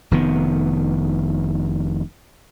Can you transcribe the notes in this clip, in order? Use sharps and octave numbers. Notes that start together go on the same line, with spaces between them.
F1 D#3 B3